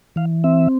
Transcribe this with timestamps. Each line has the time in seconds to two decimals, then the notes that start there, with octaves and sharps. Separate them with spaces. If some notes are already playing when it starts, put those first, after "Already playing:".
0.16 E3 F5
0.44 C4 E5